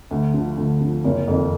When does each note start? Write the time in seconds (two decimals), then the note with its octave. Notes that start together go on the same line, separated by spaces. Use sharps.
0.11 D2
0.34 D3 F3
0.58 D2
0.81 D3 F3
1.04 F#1
1.28 F2 D#3